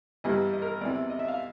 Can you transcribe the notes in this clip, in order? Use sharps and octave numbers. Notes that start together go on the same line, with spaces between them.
G2 E3 G3 A#3 D#5
D#5
A#4
E2 C3 E3 D5
D#5
E5
F5